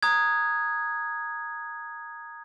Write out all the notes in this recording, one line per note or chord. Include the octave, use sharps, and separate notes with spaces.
A#5 D#6 F#6 G#6